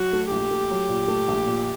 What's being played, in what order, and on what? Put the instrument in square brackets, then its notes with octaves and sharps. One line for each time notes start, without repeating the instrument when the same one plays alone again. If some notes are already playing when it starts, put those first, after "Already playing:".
Already playing: [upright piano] F#3 [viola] F#4
[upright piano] A3
[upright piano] A#1 [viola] G4
[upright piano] A3
F#3
A#2
A3
A#1
A#2